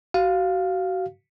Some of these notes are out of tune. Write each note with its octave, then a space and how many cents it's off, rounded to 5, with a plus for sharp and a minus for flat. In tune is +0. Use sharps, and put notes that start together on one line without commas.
F#4 +30 F5 +0